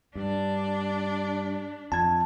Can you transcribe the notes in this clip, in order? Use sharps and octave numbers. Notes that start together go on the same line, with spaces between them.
G2 D4
F2 A5 G#6